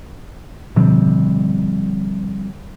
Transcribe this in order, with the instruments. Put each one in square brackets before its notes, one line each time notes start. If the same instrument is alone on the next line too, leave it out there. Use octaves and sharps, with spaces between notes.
[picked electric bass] B2 D3 [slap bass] F3 G3 C4